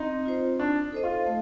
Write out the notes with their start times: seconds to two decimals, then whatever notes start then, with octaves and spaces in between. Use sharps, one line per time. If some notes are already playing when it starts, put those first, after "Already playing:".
Already playing: C4 D#4
0.25 F4 C5
0.59 D4 D#4
0.92 A4 C5 D#5
1.03 F4
1.26 A3